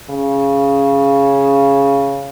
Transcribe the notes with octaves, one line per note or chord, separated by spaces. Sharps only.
C#3